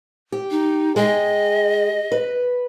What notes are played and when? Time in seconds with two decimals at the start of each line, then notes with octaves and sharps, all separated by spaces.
0.32 G4
0.51 D#4
0.96 G#3 G#4 D#5 G5
2.12 B4